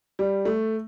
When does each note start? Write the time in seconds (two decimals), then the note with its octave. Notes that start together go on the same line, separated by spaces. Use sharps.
0.19 G3
0.45 A3